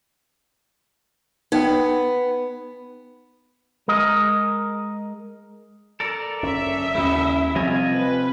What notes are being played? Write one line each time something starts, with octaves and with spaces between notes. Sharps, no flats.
B3 D#4 G5
G#3 A#4 D#5
A4 A#4 D5
F#1 F#2 C#4 E5
D#2 C#3 G#3 E4 F#4 A4
C3 F3 G3 A3 F4 D#5 G#5
B4